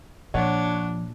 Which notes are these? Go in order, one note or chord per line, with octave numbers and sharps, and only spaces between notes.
A#2 F3 D4 C#5 F#5